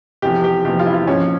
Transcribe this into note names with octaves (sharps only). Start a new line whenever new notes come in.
F1 E2 C3 F3 G4
G4
F1 E2 C3 F3 G4
F4
E4
F4
A#1 G#2 F3 C#4